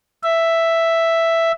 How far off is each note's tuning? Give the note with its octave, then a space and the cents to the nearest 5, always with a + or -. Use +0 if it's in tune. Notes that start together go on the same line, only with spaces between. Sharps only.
E5 +5